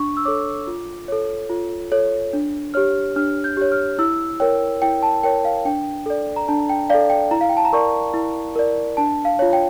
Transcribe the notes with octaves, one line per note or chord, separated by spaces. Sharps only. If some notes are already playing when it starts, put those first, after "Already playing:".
Already playing: D4 C#6
E6
A4 C#5 D6
F4
A4 C#5
F4
A4 C#5
D4
G4 C#5 F6
D4 F6
G6
G4 C#5
F6
E4 E6
A#4 C#5 G5
E4 G5
A5
A#4 C#5 G5
F5
D4 G5
A4 D5
A#5
D4 A5
G5
A4 D5 F5
G5
E4 A#5
F5
G5
A5
A#5
A#4 D5 C#6
E4
A#4 D5
D4 A5
F5
F4 C#5
G5